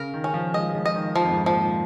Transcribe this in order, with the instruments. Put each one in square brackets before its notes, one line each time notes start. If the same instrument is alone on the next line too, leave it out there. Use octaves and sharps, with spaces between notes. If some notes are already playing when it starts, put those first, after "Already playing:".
Already playing: [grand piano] C#3 [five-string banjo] A#4
[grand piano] D#3
[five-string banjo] C#4
[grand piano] F3
[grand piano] G#3 [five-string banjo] D#5
[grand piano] G#3
F3
[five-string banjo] D#5
[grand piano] D#3
[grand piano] D#3 [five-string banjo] F3
[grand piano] F2
G#2
[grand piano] A#2 [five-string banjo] F3